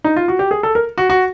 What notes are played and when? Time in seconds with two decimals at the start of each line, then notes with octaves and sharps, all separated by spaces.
0.04 D#4
0.16 F4
0.28 F#4
0.39 G4
0.51 G#4
0.63 A4
0.75 A#4
0.98 F#4
1.10 F#4